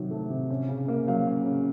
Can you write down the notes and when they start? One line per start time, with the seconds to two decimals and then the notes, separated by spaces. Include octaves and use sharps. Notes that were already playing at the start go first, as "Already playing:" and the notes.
Already playing: C3 D#3 F#3
0.11 A3
0.30 C3
0.50 C#4
0.68 C#3
0.88 A#3
1.07 F#3 F5
1.27 C#4
1.46 C#3